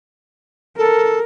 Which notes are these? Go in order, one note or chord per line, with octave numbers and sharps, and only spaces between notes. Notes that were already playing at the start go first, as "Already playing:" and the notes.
A4 A#4